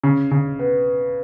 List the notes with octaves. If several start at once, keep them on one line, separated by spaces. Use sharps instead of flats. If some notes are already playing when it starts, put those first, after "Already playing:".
C#3
C#3
B3